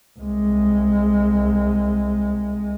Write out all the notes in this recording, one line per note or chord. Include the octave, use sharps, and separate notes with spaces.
C2 G#3